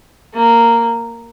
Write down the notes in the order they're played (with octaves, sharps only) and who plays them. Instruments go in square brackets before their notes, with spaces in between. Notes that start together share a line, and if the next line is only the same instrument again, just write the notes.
[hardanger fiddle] A#3